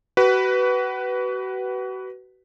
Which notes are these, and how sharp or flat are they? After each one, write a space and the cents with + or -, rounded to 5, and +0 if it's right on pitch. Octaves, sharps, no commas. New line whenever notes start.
F#4 +35 B4 +0